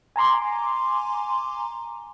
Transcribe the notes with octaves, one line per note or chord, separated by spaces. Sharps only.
G#5 A#5 C6 D6